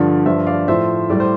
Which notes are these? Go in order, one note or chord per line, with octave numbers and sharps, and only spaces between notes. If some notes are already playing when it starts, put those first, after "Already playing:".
Already playing: G2 D3 F3
G2 F3 C5 E5
D5 F5
A2 F3 C5 E5
A2 G3 D5
C5